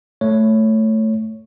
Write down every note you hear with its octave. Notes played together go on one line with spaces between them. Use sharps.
A3 C#5